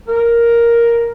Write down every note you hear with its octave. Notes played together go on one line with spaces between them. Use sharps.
A#4